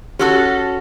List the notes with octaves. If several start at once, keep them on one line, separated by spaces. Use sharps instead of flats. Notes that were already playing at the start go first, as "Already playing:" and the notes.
C#4 F#4 G4 A4 E6